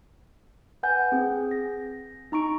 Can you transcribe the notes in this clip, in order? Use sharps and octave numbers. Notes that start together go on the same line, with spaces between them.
B4 F#5 G#5 G6
C4 G#4
A#6
D#4 A#5 C#6 D7